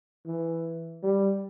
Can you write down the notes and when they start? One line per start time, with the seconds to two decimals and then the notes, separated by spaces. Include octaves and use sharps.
0.26 E3
1.03 G3